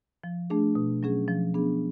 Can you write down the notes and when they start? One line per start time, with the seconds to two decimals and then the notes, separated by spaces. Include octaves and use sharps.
0.24 F3
0.50 A3 D4 G#4
0.75 B2
1.03 F#3 C#4 G#4
1.28 F3
1.54 B3 D4 G#4